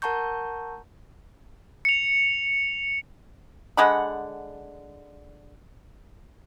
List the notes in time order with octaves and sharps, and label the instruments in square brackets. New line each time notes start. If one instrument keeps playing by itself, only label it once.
[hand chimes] A#4 F#5 A5 A#5 C#6 G6
[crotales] C#7 F7
[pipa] D3 G#3 F#5 B5